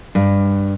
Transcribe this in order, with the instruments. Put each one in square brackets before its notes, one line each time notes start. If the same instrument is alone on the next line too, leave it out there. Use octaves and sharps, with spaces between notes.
[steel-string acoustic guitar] G2